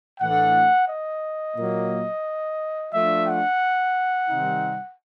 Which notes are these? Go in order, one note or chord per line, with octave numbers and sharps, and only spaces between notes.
A2 E3 A3 D4 F#5
D#5
A#2 F#3 A#3
F3 A3 D4 F4 E5
F#5
C3 D#3 G3 C4 D#4